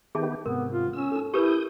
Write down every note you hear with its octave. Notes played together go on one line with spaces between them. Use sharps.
D#3 B3 G4 G#4 E5 A5
G#2 C3 B3 A#4
F4
C#4 E6
D#4 A4
E4 G4 A#4 B4 D#6 G6